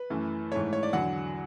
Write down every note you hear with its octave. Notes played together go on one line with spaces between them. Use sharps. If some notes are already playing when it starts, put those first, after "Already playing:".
Already playing: B4
F#2 E3 A3
G#2 E3 A3 C#5
C#5
D5
E2 D3 F#3 F#5